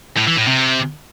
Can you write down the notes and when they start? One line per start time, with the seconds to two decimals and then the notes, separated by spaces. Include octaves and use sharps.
0.17 A2
0.27 E3
0.37 A2
0.47 C3